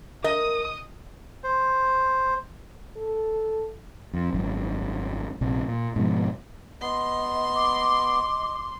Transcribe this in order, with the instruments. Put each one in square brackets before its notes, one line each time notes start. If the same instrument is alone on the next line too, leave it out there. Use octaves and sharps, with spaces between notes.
[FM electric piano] A#4 [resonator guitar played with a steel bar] D#5 [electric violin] D#6
[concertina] C5
[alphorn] A4
[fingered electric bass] F2
G#1 F#2
A#1 C3
A#2
G#2 B2 F3
[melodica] B3 [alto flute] D#5 [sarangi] C6
[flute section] D6